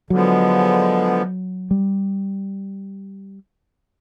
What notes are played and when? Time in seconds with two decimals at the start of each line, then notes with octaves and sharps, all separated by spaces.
0.10 D3 F3 F#3 G#3 B3
1.71 G3